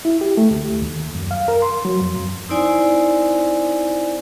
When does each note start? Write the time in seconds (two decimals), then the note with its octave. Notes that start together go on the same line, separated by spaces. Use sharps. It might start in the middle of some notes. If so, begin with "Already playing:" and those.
0.05 E4
0.21 G4
0.37 A3
0.51 D2
0.82 D#2
1.15 F#2
1.31 F5
1.48 A#4
1.62 C6
1.85 F#3
2.01 F2
2.16 F#2
2.49 C4 D#4 E4 C5 D5 G#5